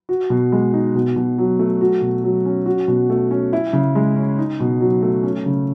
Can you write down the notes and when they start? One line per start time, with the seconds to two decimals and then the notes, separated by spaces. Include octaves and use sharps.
0.09 F#4
0.30 B2
0.52 G#3
0.73 D#4
0.95 B2
1.16 B2
1.38 F#3
1.59 A3
1.81 F#4
2.02 B2
2.24 F#3
2.46 C#4
2.66 F#4
2.88 B2
3.10 A3
3.31 C#4
3.53 E4
3.73 C#3
3.95 G#3
4.16 C#4
4.38 D#4
4.60 B2
4.81 F#3
5.02 A3
5.23 C#4
5.46 C#3